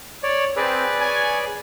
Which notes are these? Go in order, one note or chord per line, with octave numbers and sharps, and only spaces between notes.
C#5 D5
C4 G#4 B4 D5
C#5 G#5